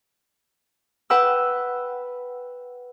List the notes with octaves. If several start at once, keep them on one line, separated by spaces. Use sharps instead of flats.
B4 F#5 G5 E6